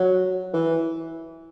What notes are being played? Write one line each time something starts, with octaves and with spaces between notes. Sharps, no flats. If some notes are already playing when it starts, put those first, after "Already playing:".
Already playing: F#3
E3